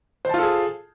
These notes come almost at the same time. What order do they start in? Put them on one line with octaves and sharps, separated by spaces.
C5 A5 F4 A4 G#4